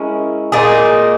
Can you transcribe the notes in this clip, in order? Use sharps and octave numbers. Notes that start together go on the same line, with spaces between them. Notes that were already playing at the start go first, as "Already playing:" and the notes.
Already playing: G#3 C#4 E4 A#4
A#2 A#3 D#4 G#4